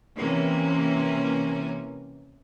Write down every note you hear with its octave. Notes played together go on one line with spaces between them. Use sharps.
C3 E3 A#3 C#4